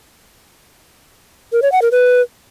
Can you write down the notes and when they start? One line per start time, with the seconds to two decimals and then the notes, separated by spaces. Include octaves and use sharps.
1.53 A#4
1.62 C#5
1.72 F#5
1.82 A#4
1.92 B4